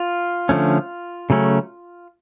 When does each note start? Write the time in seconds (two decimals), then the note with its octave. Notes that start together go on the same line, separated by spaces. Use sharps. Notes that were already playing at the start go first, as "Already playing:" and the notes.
Already playing: F4
0.49 D3 F3 A3 C#4
1.30 C#3 F#3 A3 C#4